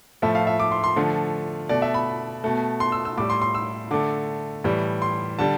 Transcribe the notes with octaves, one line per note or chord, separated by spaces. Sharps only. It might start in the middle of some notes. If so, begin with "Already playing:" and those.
A2 F3 A3 E5
F5
E5
D6
C6
C6
D3 F3 A3
B2 A3 D5
E5
B5
B2 A3
C6
E6
E6
A2 G3 D6
C6
C6
E6
D3 A3 D6
A2 E3 G3
C6
D3 G3 A5